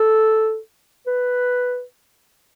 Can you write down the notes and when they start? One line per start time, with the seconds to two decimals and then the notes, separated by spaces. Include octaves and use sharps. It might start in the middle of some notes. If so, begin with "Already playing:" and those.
Already playing: A4
1.07 B4